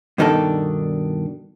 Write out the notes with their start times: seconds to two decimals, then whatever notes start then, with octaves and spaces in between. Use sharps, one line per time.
0.18 G2 B2 D#3 D4 A4